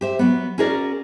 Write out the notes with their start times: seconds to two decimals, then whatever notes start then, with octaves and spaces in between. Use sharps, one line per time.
0.01 G4 C5 E5
0.19 F#3 B3
0.58 C#4 F#4 G#4 A#4 C#5 D5